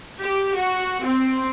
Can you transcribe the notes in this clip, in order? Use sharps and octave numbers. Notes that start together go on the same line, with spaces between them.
G4
F#4
C4